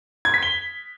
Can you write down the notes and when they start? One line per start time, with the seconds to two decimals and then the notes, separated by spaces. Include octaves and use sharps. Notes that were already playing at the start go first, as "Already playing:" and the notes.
0.25 G#6
0.34 B6
0.43 G7